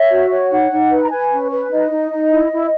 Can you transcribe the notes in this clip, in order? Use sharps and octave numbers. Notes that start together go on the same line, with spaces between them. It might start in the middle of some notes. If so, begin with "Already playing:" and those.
Already playing: C#5 E5
F#4
C#5
D#4 F#5
D#4
B4
A#5
B4 G#5
C#4
B4
D#4 D#5
D#4
D#4
E4
E4